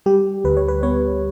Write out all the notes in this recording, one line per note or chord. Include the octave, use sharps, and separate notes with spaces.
G3 G4
D2 B4
C#5
B4
B3 C#5